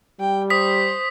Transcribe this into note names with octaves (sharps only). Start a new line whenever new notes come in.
G3 G5
C5 D#6 B6